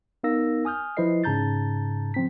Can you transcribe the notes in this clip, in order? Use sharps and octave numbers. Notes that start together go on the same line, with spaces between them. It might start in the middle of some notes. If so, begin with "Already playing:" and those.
B3 D#4 A#4 F5 E6 A#6
G#5 D#6 F6 G6
F3 E4 B4 C5 D#5 C7
G#2 C#3 A5 A#5 G6 A6
F3 C4 B6